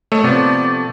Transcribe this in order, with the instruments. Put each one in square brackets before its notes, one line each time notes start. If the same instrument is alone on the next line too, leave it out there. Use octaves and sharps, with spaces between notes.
[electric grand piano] A3 [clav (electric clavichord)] A4 C#5 D#5
[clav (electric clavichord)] C3 F3 B3 [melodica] D5